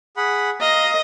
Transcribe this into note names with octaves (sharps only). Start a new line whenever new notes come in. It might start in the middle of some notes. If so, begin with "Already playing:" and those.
G#4 F#5 B5
D#5 F5 A#5